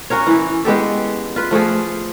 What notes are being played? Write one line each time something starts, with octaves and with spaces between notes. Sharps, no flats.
C#4 F#4 A#4 C#5
E3 E4
G#3 B3 G4 A4
F4 B4
F3 A3 F4 G#4